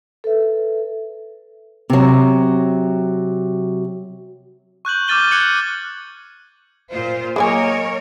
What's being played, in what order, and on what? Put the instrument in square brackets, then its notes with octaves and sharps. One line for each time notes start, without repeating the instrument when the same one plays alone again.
[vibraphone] A4 B4 E5
[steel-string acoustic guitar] C3 F#3
[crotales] C#6 F#6 G6 F#7
D6 F6 G6 A6 D#7 G7
F#6 G#6 C#7 F#7
[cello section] A#2 F4 C5
[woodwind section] F#3 A#3 D#5 [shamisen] G#3 B4 G#5 [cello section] A#4 C#5